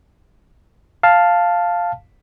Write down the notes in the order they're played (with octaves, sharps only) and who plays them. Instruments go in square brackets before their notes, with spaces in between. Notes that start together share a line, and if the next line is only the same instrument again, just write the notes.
[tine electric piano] F5 A5